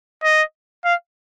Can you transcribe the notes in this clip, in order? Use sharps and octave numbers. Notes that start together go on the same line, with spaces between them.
D#5
F5